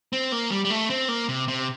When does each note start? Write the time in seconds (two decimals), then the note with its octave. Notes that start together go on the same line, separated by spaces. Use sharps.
0.13 C4
0.32 A#3
0.51 G3
0.65 G3
0.70 A3
0.90 C4
1.08 A#3
1.29 C3
1.48 C3